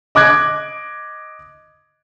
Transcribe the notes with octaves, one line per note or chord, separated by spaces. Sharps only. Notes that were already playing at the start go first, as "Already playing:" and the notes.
D#5 D6 F#6 G#6